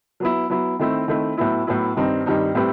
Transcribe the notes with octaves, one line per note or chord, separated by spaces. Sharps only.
F#3 B3 E4
F#3 B3 E4
D#3 A3 C4 E4
D#3 A3 C4 E4
A2 F#3 B3 E4
A2 F#3 B3 E4
G2 D#3 G3 C4 D#4
G2 D#3 G3 C4 D#4
A2 G3 C4 E4 B4